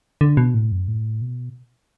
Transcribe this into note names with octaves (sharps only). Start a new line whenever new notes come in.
D3
B2
A2
F#2
A2
B2